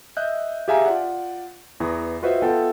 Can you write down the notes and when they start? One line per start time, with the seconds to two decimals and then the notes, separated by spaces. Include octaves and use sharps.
0.17 D#5 E5 F#6 G6
0.68 G4 G#4 E5 F5 G#5 A#5
0.86 F4 D5 F#5
1.80 E2 E3 D#6
2.23 F4 F#4 B4 C5 D#5 E5
2.42 B3 F4 A4 E5 F#5 G5